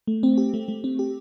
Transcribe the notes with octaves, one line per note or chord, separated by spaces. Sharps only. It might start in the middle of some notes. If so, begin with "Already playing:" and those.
A3
C4
G4
A3
A3
C4
G4